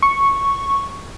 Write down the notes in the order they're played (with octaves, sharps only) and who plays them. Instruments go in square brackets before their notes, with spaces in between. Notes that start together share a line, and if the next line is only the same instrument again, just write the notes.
[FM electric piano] C#6